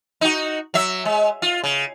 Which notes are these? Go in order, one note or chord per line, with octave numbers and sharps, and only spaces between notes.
D#4 F#4
F#3 E5
G#3
F4
C#3